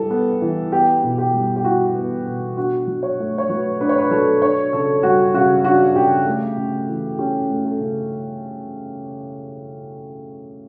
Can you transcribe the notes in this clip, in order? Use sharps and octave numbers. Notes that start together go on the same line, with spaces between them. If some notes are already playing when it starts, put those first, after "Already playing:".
Already playing: G3 E4 A4
B3
E3
B3 G4
B2
G4
G3
G4
E4 F#4
B3
B2
D4 F#4
F#3
C#5
A3
C#5
F#3 B4
D4 B4
C#5
B4
F#3 A4
D4 C#5
C#3 A4
G3 F#4
C#3 F#4
D4 F#4
C#3 G4
A3
C#3
E3
C#4 G4
A3
A4
C#3